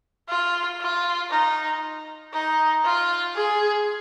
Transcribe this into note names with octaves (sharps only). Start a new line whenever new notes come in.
F4
F4
D#4
D#4
F4
G#4